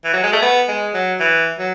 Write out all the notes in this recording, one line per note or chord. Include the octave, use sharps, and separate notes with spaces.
E3
F#3
G#3
A3
B3
G#3
F#3
E3
F#3